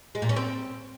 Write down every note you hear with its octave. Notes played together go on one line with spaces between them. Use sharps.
G#3
A#2
C#4
C4